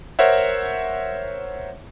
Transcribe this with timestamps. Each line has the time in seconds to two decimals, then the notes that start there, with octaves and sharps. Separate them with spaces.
0.19 A#4 C5 C#5 E5 F#5